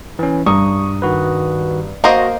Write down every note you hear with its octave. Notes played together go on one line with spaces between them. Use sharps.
E3 C#4
G2 A#5 C#6 D#6
D#3 F#4 B4
A#3 F#4 C5 D#5 A#6